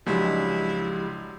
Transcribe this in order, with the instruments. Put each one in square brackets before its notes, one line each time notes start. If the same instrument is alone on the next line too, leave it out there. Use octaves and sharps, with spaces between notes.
[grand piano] C#2 G#3 [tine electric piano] F3 G4 [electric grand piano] F#3 D4 [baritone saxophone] E4